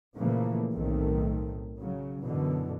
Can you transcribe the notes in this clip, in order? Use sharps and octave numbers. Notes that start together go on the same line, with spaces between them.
A#2 C#3 E3 F3 A3 A#3
B1 A2 D#3 A3 C4
C#3 F#3
F#2 B2 D3 E3